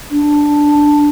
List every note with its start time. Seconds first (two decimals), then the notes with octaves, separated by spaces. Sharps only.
0.11 D4